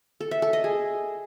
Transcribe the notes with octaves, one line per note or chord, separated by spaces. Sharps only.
A4
E5
A4
D#5
G#4